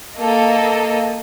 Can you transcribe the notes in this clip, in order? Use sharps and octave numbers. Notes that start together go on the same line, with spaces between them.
A#3 A4 D#5